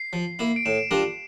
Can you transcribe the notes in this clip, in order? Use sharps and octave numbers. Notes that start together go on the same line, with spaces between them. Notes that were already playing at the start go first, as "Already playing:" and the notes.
Already playing: C7
F3
A#3 E4
D7
A2 E7
G3 D4 F4 A#4